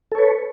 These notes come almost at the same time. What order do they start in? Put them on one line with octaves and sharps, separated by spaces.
A4 C#5 B4